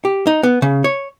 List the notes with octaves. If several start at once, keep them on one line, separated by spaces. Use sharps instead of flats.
G4
D#4
B3
C#3
C#5